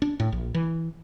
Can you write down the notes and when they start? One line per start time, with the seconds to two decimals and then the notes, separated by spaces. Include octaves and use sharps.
0.02 D4
0.20 A2
0.32 A#1
0.54 E3